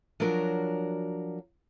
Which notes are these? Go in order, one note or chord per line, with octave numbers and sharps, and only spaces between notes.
F3 F#3 D4 F#4 A#4